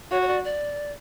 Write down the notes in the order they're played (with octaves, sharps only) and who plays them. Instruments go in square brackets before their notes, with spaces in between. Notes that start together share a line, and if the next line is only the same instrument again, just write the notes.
[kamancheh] F#4 [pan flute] C#5
[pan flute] C#5
D5
D5